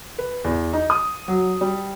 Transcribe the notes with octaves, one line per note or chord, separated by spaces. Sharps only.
B4
E2
D#4
D#6
F#3
G3